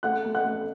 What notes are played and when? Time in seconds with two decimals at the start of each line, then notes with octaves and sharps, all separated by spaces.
0.03 A3 F#5 F#6
0.25 A3
0.34 F#5 F#6
0.44 A3